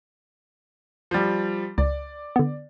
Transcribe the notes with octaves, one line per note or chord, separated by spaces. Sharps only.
F3 G3
C#2 D5
D3 B3